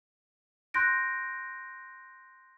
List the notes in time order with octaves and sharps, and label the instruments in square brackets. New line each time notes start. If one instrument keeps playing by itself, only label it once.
[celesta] C6 F#6 G6 A#6 D7